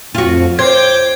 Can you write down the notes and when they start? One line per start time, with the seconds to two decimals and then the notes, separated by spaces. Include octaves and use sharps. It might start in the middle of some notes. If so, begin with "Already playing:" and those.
0.15 F2 F4 F#4
0.59 C5 G5 D6 G#6